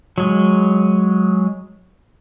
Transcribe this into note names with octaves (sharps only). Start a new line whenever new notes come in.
F#3 G#3